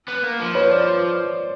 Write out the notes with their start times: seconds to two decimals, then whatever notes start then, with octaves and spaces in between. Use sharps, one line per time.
0.08 B3
0.23 A#3
0.39 F3
0.55 B4 C#5
0.71 C5 D5